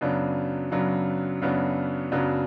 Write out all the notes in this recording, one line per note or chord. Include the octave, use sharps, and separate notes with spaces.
F#2 C#3 F#3 B3 D4
F#2 C#3 F#3 B3 D4
F#2 C#3 F#3 B3 D4
F#2 C#3 F#3 B3 D4